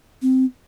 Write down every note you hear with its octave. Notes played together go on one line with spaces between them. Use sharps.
C4